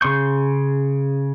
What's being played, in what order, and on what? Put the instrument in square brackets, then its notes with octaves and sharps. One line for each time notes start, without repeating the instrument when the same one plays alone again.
[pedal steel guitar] C#3 C6 C#6 G6